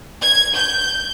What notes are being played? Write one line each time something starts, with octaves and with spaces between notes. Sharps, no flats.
G#6
G6